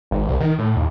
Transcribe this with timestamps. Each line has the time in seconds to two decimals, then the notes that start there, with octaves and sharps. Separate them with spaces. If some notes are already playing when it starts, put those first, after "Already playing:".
0.11 G#1
0.28 C2
0.40 D#3
0.59 A2
0.76 D#2